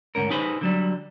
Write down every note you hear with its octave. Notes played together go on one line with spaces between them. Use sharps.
D2 G#2 C#4 A#4
D#4 G4 G#4 B4 C5
D3 F#3 G3